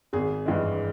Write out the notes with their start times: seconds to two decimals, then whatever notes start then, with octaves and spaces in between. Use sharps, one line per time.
0.13 G#1 G#4
0.46 G2 E3 G#3